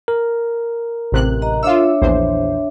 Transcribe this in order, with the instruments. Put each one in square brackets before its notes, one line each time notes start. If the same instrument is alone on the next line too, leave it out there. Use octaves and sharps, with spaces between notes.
[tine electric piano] A#4
[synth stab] A1 C3 F#6
[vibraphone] D#5 A#5
[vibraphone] D4 C#5 E5 [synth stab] F4 E6
[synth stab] A#1 E2 C5